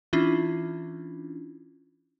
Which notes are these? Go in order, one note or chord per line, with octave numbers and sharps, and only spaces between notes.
E3 C#4 D4 E4 F4